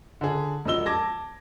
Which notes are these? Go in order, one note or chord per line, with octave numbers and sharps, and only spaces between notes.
D3 G#4
E1 F3 D#5 E6 G7
A5 D6 G#6 A#6